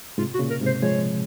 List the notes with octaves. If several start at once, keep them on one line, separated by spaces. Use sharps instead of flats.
G#2 C3 F4
F#4
A#2 C#3
A#4
G#2 C3
C5
F3 G#3 C#5